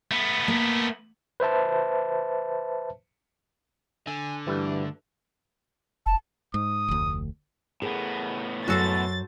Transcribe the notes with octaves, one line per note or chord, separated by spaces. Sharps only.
A3 B3
A#3
B4 C5 E5 A5
D3 G#5
D2 G2 E3 G3 A3
F1 A5
G#2 D#6
F1 D2
A2 B3 G#4 A#4
F#2 F#4 A4 C5 A6